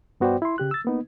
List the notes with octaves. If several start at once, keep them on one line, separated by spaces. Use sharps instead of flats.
G2 B3 F#4 C5 D5 G5
E4 C6
C#3 G4 F#6
E6 A6
A#3 B3 D#4